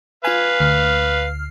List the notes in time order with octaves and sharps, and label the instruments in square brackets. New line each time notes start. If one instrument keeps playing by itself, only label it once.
[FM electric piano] F4 G#5 [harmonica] B4 F5
[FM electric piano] D2 F6 C7